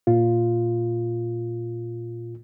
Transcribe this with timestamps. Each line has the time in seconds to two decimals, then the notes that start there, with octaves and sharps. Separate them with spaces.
0.07 A#2 F4